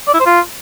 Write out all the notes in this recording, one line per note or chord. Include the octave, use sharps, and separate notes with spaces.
D5
E4
C5
F4